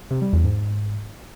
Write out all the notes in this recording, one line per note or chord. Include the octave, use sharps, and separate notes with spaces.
C3
G3
E2
G#2